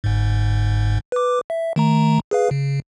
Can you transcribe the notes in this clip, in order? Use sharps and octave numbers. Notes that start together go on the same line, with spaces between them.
G1 G#2
B4 D6
E5
D#3 A3 A#5
G#4 B4 F5
C#3